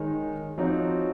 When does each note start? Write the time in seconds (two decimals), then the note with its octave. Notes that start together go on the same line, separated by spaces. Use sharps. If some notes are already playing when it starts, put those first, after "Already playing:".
Already playing: D#3 G#3 D#4 A#4 C#5
0.58 F3 C4 D#4 F#4 C#5